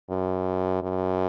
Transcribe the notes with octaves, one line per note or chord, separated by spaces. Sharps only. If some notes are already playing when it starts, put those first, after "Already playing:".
F#2
F#2